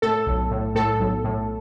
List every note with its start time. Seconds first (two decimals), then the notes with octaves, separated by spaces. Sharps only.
0.02 A2 A4
0.26 B1
0.51 A2
0.75 A2 A4
1.00 B1
1.24 A2